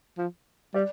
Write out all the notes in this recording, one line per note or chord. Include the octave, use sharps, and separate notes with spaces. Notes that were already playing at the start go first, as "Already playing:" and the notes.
F3
G3 D5